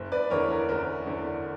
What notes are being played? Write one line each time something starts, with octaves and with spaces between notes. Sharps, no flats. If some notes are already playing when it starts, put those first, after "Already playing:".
Already playing: F#1
B4 D5
E2 D3 A#4 C#5
A#4
F#1 A#4
E2 D3